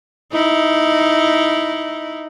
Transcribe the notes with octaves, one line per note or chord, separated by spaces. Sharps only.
D#4 E4